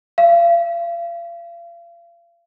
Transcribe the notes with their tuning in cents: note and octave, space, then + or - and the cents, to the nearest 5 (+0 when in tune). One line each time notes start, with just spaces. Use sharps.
F5 -35